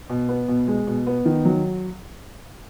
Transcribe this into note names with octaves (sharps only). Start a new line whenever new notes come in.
B2
B3
B2
G#3
B2
B3
D#3
F#3